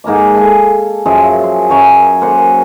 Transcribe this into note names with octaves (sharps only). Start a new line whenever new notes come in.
G#2 A#3 A#5 D6
A4 F5 G#5
F#2 F3 G#4 E5
C6
F#2 C#5 G#5 A#5
A#3 C5 F#5